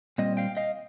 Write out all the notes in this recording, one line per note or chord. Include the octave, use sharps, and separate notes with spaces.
A#2 G3 C4 D#5
F5 G5
D#5 F5